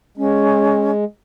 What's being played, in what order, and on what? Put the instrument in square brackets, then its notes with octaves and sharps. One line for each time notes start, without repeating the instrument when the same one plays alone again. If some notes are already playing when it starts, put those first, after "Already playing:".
[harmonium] G#3 [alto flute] C#4